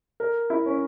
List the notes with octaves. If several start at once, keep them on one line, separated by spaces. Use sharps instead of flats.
A#4
E4
C#4